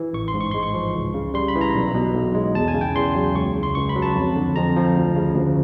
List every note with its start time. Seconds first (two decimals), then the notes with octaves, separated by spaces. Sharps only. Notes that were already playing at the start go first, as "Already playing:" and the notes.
Already playing: E3
0.13 A1 C#6
0.28 C6
0.34 G#2
0.41 C#6
0.51 G#3 C6
0.63 C#6
0.74 F3
0.95 C#2
1.14 C#3
1.34 G3 C6
1.48 B5
1.55 E3
1.61 A#5
1.74 B1
1.94 B2
2.14 B1
2.34 G#3
2.54 E2 A5
2.68 G#5
2.75 C#3
2.81 G5
2.96 E2 C6
3.15 F#3
3.35 C#2 C#6
3.56 C#3
3.63 C6
3.75 C#2 C#6
3.89 B5
3.96 F#3
4.02 A5
4.15 F2
4.36 D3
4.56 F2 A#5
4.76 F3
4.96 D2
5.16 C#3
5.36 D2